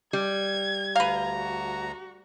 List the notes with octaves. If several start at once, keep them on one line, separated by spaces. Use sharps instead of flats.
G3 G#6
D2 B4 F5 A#5
F#4